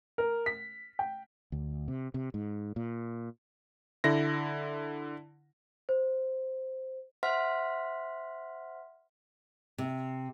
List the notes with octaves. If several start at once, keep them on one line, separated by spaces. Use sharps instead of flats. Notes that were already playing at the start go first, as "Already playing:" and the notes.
A#4
B6
G5
D2
C3
C3
G#2
A#2
D3 E4 A#6
C5
C5 E5 F#5 C6 F6 B6
C3